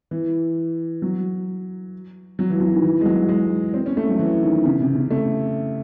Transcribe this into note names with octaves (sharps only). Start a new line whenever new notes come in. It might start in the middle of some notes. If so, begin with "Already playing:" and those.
E3
F#3
F#3
E3
F#3
D#3
E3
G#3
F#3
G#3
C4
C#4
A3
F#3
E3
D#3
C#3
C3
C#3
A3